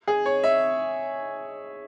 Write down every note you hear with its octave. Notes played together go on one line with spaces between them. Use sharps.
G#4
C#5
E5